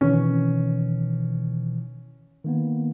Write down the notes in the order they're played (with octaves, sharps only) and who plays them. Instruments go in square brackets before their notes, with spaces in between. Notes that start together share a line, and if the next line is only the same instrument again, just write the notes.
[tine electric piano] B2 D#3 E3 [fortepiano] C#4
[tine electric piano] D#3 A#3 B3